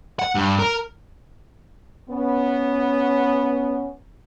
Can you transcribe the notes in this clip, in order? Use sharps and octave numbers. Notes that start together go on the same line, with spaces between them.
F#5
G2
A#4
B3 C#4